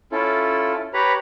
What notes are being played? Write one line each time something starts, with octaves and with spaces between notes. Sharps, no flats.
C#4 E4 F4 A4
G4 B4 C#5 A#5 B5